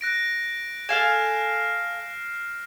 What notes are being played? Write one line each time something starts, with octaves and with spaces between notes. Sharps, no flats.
F#6 A#6 D7
A4 F5 G#5 F6 C7 E7